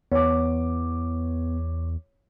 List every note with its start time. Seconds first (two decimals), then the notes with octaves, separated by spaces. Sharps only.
0.12 E2 B3 C#5 D6